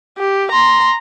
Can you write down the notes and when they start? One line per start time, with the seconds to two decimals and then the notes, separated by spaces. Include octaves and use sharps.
0.18 G4
0.52 A#5 C6